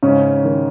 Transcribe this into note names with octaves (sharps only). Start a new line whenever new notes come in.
G#2 C#3 C#4
D#3